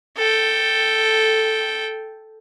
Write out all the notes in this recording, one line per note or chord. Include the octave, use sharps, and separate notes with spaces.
A4 G5